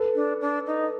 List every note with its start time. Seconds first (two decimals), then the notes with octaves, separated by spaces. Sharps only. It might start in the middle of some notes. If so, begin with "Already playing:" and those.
Already playing: A4 B4
0.15 D4
0.41 D4
0.67 D#4